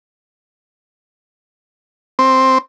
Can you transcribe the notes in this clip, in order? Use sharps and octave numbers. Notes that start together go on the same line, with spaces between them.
C4